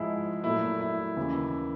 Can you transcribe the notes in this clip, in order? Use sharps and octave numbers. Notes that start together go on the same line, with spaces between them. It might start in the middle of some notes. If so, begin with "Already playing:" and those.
Already playing: G#2 F3 G#3 E4
A#2 F#3 A3 E4
E4
D#2 C#3 E3